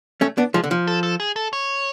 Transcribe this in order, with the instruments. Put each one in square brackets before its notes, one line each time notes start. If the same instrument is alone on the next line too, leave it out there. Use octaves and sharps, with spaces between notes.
[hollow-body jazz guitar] A3 C#4
B3 D4
F3 G#3
D3
F3
[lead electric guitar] A4
A4
G#4
A4
C#5